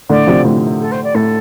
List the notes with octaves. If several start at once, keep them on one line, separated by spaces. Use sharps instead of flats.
A2 D3 D5
C3 F3
A2 D3
A4
C5
D5
A2 A4